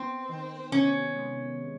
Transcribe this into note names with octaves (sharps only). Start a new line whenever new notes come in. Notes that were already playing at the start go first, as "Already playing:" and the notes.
Already playing: B3 C4
D#3
C3 C#4
G#3